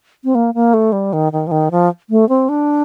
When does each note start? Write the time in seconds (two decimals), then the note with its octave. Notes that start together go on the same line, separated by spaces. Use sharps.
0.24 C4
0.35 A#3
0.54 A#3
0.74 A3
0.92 G3
1.13 D#3
1.32 D#3
1.47 F3
1.51 D#3
1.71 F3
2.10 A3
2.29 C4
2.49 D4